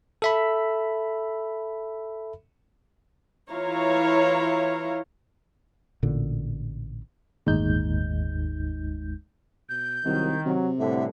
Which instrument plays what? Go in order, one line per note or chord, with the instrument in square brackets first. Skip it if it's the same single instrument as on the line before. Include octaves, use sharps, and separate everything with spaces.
[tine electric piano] A4 E5 B5
[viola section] E3 E4 F4 C#5 F5 A#5
[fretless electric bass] A1 A#2 D3
[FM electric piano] G1 D#2 A2 G#3 D#4 G6
[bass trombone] B2 [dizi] G6
[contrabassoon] C2 [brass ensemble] D#3 [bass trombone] F#3
[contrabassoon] C3 [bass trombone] F#3
[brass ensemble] C2 D3 [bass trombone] A2 [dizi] E5